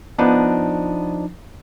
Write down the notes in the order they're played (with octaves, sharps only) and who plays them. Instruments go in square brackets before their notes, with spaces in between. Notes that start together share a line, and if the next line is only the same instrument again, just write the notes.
[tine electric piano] F3 D4 D#4 [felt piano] B3